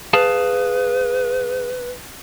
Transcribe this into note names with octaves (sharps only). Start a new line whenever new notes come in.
G#4 B4 F5 A5